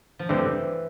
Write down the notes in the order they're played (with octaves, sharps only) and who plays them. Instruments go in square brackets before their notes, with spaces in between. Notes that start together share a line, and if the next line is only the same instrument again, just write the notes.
[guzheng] F3
[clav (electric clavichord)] G2 D3 A3 C4 [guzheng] E3